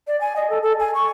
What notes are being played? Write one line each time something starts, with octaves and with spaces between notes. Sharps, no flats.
D5
G#5
D#5
A4
A4
G#5
C#6